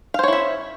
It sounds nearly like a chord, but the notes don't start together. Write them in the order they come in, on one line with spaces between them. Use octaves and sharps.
F5 C5 C#5 E4 E5